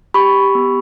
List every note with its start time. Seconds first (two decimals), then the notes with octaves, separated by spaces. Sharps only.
0.14 G4 B5 C#6
0.55 B3